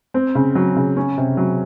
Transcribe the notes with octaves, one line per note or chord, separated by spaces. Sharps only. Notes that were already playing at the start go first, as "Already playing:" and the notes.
C4
C#3
F#3
C#3
C#4
C3
F#3